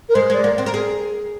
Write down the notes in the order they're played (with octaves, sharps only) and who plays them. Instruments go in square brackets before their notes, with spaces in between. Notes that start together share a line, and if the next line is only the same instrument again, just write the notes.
[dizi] A#4
[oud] G#3 [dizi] C5
[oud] G#3 [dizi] D5
[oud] A#3
C4
A#4
G#4